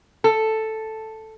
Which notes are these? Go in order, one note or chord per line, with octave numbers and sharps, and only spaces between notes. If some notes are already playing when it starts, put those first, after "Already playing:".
A4